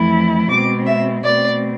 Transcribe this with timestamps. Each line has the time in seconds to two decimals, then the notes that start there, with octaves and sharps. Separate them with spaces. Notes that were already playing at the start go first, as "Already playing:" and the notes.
Already playing: F2 E3 A3 E4
0.50 B2 G#3 C4 D6
0.87 E5
1.24 B2 A3 C4 D5